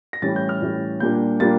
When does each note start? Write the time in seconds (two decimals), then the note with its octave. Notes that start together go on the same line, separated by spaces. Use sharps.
0.13 A#6
0.22 A2 E3 G3 C#4 A6
0.36 G6
0.49 F6
0.62 A2 E3 G3 C#4
1.00 A#2 G3 A#3 D4 G6
1.40 A#2 G3 A#3 D4 A6